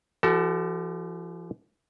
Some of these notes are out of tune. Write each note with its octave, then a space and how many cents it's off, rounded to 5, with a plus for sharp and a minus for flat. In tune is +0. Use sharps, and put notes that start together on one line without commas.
F3 -45 F#4 +35 A4 +0